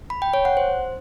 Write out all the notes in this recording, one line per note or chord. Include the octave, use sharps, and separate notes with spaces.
B5
G5
C#5
F#5
C5